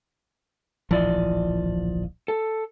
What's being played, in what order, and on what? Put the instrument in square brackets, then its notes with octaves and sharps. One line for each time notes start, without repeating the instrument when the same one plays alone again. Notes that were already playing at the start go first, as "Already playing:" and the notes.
[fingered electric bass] D1 A#1 E3 [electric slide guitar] F3 D5 D#5
[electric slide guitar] A4